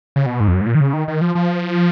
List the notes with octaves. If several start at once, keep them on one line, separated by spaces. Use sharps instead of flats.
C#3
B2
G#2
F2
F#2
G#2
A#2
D#3
C#3
D#3
D#3
F3
F3